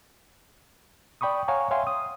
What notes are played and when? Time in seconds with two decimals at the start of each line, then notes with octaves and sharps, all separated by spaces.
1.21 D5 G5 B5 C#6 D#6
1.48 C#5 F5 F#5 G#5 A#5 C#6
1.71 C#5 E5 F5 G5 G#5 C6
1.87 D#6